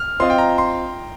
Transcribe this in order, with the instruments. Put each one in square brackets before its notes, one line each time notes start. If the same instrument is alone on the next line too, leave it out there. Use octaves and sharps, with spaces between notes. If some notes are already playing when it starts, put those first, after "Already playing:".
Already playing: [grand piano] F6
[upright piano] C4 F4 D#5 [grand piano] C6
[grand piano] G5
A#5
C6